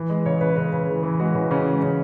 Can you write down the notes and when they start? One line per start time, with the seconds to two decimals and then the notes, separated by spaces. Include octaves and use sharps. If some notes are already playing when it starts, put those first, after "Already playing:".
Already playing: E3
0.10 G#3
0.26 C#3 C#5
0.41 C#3 B4
0.56 C#3 B4
0.73 C#3
0.88 E3
1.03 E3
1.20 G#3 F#4
1.35 E3 C#4
1.51 C#3 C#4
1.66 G#3
1.82 C#3 C#4